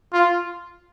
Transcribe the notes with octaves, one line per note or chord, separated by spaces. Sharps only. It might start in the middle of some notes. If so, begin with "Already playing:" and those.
F4